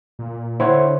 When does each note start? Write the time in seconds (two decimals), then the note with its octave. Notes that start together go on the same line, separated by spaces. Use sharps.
0.19 A#2
0.60 D3 E4 C5 C#5 F#5